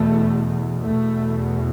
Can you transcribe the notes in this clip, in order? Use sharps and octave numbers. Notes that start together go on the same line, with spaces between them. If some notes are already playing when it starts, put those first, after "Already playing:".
Already playing: E2 B2 A3
E2 B2 A3